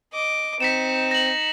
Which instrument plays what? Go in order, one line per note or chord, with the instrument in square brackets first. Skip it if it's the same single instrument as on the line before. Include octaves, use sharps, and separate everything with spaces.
[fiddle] D#5 D6
[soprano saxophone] C4 [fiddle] D#4 [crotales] B6 C#7 E7
[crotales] A#6 F#7